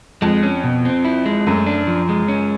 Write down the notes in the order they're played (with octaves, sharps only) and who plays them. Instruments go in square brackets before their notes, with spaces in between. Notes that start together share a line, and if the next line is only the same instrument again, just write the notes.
[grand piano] F2 [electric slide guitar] G#3
[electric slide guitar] C#4
B2
C4
E4
G#3
[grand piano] F#2 [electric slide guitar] A3
[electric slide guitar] D4
F3
G#3
C#4